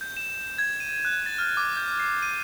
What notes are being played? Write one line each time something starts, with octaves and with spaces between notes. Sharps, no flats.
G6
E7
G#6
D#7
F#6
A6
F6
D6
G6
C7
D#7